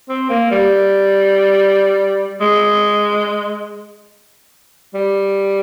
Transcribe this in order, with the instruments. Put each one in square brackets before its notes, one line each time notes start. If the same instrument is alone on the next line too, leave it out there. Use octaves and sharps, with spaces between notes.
[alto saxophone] C4
A#3
G3
G#3
G3